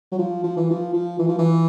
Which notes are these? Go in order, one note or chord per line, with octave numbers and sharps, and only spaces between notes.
F#3
F3
F3
E3
F3
F3
E3
F3
E3